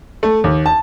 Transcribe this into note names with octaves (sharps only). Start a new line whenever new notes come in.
A3
D#2
A5